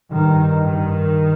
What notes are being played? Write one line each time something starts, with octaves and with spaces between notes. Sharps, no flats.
G2 D#3
D#3